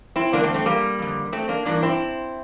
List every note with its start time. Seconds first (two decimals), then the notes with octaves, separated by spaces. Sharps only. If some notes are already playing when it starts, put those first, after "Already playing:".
0.16 C4 E4
0.32 G2 D3 A#3 D4
0.43 A3 C4
0.54 A3 C4
0.66 G3 A#3
0.99 F2 D3
1.33 A3 C4
1.49 A#3 D4
1.65 G2 E3 A#3 D4
1.83 C4 E4